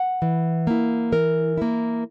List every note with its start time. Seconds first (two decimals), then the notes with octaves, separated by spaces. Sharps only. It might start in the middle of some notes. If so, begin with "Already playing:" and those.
Already playing: F#5
0.22 E3
0.67 A#3 E4
1.12 E3 A#4
1.58 A#3 E4